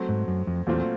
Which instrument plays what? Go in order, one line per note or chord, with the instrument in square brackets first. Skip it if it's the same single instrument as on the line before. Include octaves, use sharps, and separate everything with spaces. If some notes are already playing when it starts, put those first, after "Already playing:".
Already playing: [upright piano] F#3 A3 C4
[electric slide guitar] G#2
F#2
F2
[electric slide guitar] E2 [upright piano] A#2 F#3 A3 C4 F4